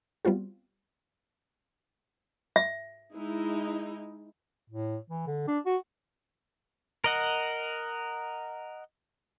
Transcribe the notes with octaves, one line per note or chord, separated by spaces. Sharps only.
G3 B3 C4 F4 F#4
E5
G#3 D#4 E4
A2
E3
D3
D4
F#4
A#4 D#5 F#5